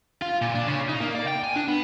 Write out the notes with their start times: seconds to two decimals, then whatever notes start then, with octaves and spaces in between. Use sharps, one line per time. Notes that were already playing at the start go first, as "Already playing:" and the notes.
0.22 F4
0.41 A#2
0.54 D4
0.67 C#3
0.89 D#4
1.01 A#3
1.15 D5
1.28 G5
1.44 G#5
1.56 D4
1.68 B3